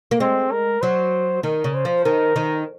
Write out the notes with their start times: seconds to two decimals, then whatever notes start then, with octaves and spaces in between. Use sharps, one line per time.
0.11 A#3
0.20 G#3 C4
0.51 A#4
0.82 F#3 C5
1.43 D#3 A#4
1.64 C#3
1.74 C5
1.85 F3
2.05 D#3 A#4
2.36 D#3